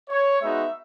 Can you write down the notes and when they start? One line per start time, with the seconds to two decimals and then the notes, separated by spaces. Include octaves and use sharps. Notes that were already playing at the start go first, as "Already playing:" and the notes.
0.09 C#5
0.42 G#3 B3 D#4 F#4 E5